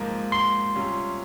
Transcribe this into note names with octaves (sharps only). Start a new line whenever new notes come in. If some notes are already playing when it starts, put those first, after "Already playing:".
Already playing: G#2 F3 A#3
C6
C3 G3 C#4 F4